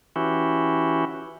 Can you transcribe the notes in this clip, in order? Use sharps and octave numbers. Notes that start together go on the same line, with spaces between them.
E3 C#4 E4 F#4 G4